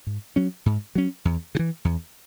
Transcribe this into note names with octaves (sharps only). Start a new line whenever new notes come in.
G#2
F#3 C#4
G#2
F#3 C#4
E2
C#3
E3
E2